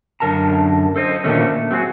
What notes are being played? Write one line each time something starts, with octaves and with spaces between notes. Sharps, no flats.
F#2 D3 A#4 A5 A#5
A4 C5 D#5
A#2 D3 D#3 A3 C#4
A3
F#3 C4 F#4 G#4